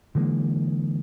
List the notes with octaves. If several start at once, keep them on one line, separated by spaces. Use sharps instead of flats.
D3 E3 G#3 A#3